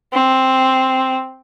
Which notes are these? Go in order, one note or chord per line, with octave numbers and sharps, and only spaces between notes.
C4